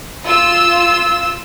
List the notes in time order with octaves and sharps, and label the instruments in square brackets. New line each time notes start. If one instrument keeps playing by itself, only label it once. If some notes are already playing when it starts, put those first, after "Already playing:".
[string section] F4 E6